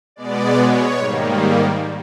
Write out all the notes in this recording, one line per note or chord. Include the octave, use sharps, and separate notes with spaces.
B2 G#3 B3 D5
C#5
G#2 D#3 G3 A#3